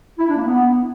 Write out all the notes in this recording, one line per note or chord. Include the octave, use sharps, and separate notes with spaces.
E4
D4
A#3
B3